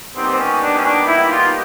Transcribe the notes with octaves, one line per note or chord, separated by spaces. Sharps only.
A#2 G3 B3 C4 D#4 G4
C4
C#4
D4
C#4
D4
E4
F4